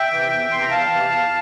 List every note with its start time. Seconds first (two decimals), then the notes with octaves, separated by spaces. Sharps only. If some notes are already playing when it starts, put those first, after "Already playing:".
Already playing: E5 G5
0.11 C3 E3
0.31 E2
0.51 C3 E3 C6
0.61 A#5
0.70 E2 F5 A5
0.90 C3 E3
1.10 E2